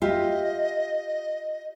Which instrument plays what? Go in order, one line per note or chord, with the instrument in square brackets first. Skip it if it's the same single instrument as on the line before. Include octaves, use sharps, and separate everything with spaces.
[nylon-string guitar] F4 G4 E5 [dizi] D#5